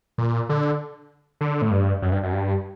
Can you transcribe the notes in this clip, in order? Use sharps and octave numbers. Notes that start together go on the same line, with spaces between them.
A#2
D3
D3
A2
G2
F#2
G2
F#2
G2